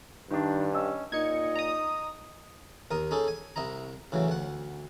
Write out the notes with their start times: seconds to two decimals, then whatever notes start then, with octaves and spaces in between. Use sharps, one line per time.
0.31 G2 D#3 D4
0.72 C#4 D#5 E6
1.12 A#2 D#4 D#5 G#6 C#7
1.56 A#5 D#6
2.91 D#2 A#4 D#6
3.11 C#4 D#4 G#4 A4
3.28 G#5
3.56 C2 E4 D#5 A#5
4.12 A2 C#3 E3 F#3
4.28 D2 F#5